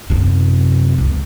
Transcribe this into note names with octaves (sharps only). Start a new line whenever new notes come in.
F#2 C3
C#2